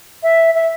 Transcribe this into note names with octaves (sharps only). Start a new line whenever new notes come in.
E5
E5